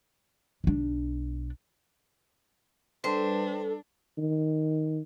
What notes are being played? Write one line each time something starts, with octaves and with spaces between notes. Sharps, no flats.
B1 D4
G3 D4 A4 B4 C5
D#3